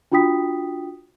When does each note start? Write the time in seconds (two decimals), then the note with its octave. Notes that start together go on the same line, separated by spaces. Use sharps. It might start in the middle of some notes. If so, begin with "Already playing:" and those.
0.12 D4 F4 F#4 G5 D#6 B6